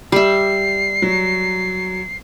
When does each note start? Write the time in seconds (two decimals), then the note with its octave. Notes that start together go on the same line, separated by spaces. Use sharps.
0.12 G3 G4 E5 C7
1.02 F#3